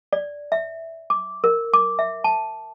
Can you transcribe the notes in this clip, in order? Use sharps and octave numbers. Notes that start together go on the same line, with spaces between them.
D5
E5
D6
A#4
D6
E5
A5